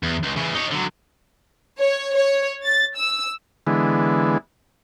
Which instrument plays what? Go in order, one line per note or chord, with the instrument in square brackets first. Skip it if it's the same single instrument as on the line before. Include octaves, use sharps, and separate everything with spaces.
[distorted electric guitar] E2
C#2
E2 C#3
D#4 C#5
D3 F#3
[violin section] C#5
C#5
A6
E6
[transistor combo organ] D3 E3 G#3 B3